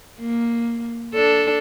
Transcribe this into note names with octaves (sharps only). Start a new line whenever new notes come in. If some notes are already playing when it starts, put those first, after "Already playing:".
A#3
D4 A4